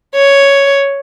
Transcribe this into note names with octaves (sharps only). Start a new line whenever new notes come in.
C#5